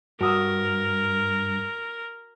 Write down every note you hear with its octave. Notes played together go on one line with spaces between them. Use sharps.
G2 F#4 A#4 D#6 E6